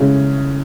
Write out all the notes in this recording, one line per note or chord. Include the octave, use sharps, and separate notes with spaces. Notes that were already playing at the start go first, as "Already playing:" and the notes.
Already playing: C#3 G#3 C#4 E4